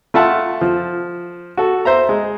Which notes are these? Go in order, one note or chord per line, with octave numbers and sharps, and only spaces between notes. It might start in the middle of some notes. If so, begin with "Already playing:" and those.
A3 F4 E5 F#5 A5
F3
F#4 A4
C5 E5 A#5
G#3